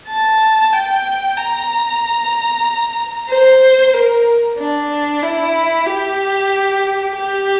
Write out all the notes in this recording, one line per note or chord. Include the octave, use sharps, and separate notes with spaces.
A5
G5
A#5
C5
A#4
D4
E4
G4
G4